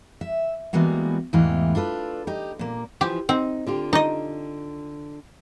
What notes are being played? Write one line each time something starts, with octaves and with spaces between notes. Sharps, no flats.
E5
E3 G3 G#3 A#3 B3 F#4
E2 G#2 E3 A3 G4 F5
D4 F4 A4 B4
D#4 G4
A#2 A#3
E3 F3 G4
C4 D#4
D3 F4 G4
D#4 D#5